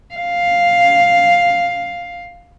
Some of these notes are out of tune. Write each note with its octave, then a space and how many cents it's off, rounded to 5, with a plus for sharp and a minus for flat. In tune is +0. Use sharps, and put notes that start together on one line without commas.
F5 +5